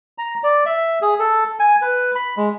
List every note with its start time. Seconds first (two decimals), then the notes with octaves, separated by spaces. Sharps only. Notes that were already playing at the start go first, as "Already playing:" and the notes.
0.18 A#5
0.44 D5
0.66 E5
1.02 G#4
1.19 A4
1.60 G#5
1.82 B4
2.15 B5
2.37 G#3